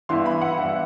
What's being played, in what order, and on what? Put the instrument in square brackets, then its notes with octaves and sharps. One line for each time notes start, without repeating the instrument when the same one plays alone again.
[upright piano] G2 E3 B3 E4 C6
B5
F#5
G2 E3 B3 E4